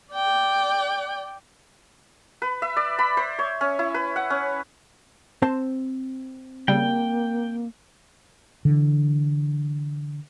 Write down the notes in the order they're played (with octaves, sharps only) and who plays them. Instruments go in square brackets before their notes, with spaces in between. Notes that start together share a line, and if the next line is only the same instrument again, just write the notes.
[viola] D5 G5
[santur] B4
E5
D5
B5
C5
C#5
C#4
E4
B4
F#5
C#4
[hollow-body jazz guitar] C4 C5 A5
[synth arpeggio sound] C#3 G3 [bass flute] A#3 [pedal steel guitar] G5
[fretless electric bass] D3 E3